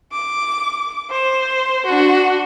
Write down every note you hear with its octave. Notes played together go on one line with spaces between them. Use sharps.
D6
C5
D4 F#4